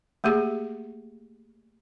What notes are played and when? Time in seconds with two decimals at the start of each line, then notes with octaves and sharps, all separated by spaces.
0.24 A3 A#3 G4 G#4